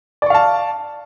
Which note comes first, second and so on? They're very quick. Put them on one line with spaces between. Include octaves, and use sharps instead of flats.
D5 C#6 F5 A5